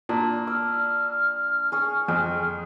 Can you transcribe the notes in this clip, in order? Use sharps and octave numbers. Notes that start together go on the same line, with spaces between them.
A#2 D4
E6 F6
G#4 C#5
F2 G#4